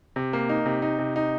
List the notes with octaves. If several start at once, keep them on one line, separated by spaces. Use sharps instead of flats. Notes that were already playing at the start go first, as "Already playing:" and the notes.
C3
A#3
D#4
C3
D#4
C3
D#4